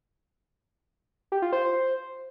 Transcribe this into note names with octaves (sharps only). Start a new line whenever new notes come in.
G4
F4
C5